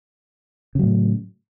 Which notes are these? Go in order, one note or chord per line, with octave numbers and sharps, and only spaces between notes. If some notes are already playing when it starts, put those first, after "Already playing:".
A2 C#3 F#3